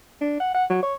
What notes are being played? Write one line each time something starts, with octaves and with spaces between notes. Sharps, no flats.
D4
F#5
F#5
F#3
C#5